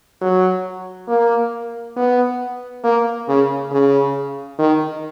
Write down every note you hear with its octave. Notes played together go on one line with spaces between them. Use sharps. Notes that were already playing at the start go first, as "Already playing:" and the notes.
F#3
A#3
B3
A#3
C#3
C#3
D#3